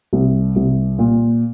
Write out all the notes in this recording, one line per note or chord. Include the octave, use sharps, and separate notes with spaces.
C2
C2
A#2